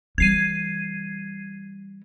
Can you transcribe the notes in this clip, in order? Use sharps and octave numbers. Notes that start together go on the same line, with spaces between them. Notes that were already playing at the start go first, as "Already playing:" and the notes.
E3 G3 G#6 C7 D#7